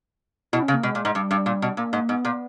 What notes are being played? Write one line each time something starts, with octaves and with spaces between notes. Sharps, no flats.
B2 E4
C#4
C#3
A#3
B2 G#3
A#2
G#2
G2 G3
G2
A#2
B2
A#2 A#3
G#2
G#2 B3
A#2